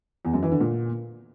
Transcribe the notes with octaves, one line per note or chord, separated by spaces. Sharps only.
E2
F#2
E3
D3
A#2